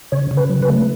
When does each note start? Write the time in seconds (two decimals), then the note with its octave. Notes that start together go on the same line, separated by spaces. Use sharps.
0.12 C#3 C#5
0.31 C#3
0.37 B4
0.50 F#3
0.62 B4
0.69 A3